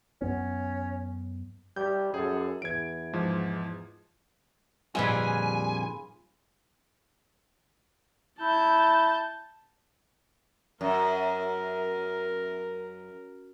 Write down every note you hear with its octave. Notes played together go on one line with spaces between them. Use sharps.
F#2 B3 C#4
G3 G6
F#2 G#4 A4
E2 G#6 D7
G#2 F3
F2 A#2 D3 G3 F4 G#4 B4 G#5
E4 A5 G6
F#2 A#4